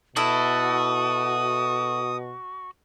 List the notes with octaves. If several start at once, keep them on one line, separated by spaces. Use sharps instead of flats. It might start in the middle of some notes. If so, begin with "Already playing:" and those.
B2 E4 F#4 A4 E5 D#6